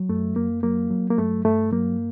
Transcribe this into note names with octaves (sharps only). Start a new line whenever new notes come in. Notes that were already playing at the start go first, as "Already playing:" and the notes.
Already playing: F#3
F#2 A3
F#2 A#3
F#3 A#3
F#3
A#3
G2 A3
G2 A3
F#3 A#3